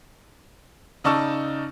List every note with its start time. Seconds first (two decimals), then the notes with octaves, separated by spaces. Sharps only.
1.04 C#3 D#4 D5 A5 C#6 E6